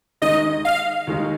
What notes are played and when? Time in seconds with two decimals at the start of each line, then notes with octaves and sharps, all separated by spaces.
0.22 D#2 D#3 G#3 D#4 D#5
0.65 F5
1.07 D#2 D#3 G#3 D#4